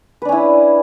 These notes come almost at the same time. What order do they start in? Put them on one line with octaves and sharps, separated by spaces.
B4 D4 C#4 E4